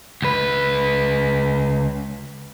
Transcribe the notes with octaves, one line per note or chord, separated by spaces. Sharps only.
C#2 B4